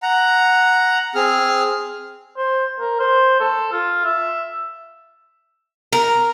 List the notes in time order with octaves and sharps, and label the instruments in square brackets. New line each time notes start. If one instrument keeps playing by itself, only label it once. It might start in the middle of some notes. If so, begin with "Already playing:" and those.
[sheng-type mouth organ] F#5 A#5
C4 G#4 F6
[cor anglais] C5
A#4
C5
A4
F4
E5
[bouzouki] A#4